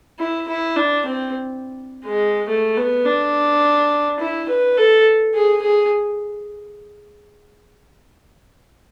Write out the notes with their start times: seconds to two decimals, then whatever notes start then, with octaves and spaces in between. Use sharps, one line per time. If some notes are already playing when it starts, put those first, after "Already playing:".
0.19 E4
0.48 E4
0.76 D4
1.05 C4
2.05 G#3
2.48 A3
2.77 B3
3.05 D4
4.20 E4
4.49 B4
4.77 A4
5.34 G#4
5.62 G#4